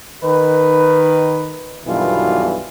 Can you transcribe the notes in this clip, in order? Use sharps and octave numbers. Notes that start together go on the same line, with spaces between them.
D#3 B4
B1 G2 B2 D#3 E3 F4